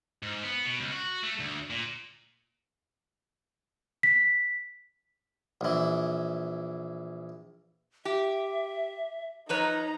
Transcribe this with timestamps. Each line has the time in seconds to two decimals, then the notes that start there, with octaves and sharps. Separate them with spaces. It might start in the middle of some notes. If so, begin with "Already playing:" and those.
0.22 G#2
0.44 B3
0.66 B2
0.79 C#2
0.92 F#4
1.23 A3
1.40 D2
1.70 A#2
4.03 B6
5.61 A#1 E3
8.05 G4 E5
9.49 F3 D#4 B4 C#5 A#5